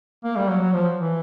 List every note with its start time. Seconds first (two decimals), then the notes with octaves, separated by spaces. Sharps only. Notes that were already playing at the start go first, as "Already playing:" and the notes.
0.24 A#3
0.36 G3
0.49 F#3
0.61 F#3
0.74 F3
0.98 E3